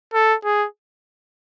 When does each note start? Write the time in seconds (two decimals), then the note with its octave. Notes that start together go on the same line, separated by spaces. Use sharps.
0.14 A4
0.45 G#4